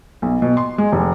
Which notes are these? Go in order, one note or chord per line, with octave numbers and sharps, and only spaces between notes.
B1
B2
C6
G#3
F1